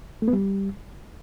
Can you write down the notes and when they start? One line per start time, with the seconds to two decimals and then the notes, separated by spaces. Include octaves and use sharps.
0.22 A3
0.28 B3
0.33 G3